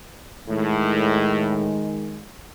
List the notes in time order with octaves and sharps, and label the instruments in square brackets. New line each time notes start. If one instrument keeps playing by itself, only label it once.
[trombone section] A2 [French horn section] D#3 G#3